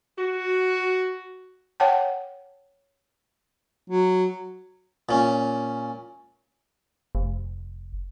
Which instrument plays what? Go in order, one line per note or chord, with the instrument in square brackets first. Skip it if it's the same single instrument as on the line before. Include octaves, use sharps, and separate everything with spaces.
[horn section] F#4
[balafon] C#5 F#5 G5 A5
[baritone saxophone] F#3
[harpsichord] A#2 C#4
[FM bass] F1